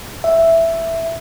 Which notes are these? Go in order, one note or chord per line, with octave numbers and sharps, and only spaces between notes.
E5